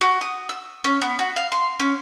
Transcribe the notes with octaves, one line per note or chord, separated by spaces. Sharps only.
F#4
D#6
E6
C#4
B3
F#4
F5
C6
C#4